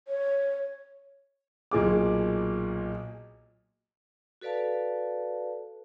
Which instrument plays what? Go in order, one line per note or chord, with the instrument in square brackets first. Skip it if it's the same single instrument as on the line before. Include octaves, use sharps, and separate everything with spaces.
[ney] C#5
[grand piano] B1 A#2 G#4 D6
[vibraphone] F#4 A4 B4 D5 F5 A5